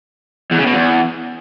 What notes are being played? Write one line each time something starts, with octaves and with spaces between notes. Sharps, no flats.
E2
C#3
B2
E2